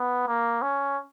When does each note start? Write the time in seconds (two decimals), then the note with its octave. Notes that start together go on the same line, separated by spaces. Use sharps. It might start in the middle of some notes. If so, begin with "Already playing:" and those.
Already playing: B3
0.27 A#3
0.62 C#4